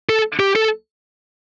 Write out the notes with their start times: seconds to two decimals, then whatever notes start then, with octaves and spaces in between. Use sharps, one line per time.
0.09 A4
0.40 G4
0.56 A4